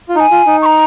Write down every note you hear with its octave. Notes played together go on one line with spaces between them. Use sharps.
F4
D#4 G#5 A#5
F4
D#4
C#6
A#5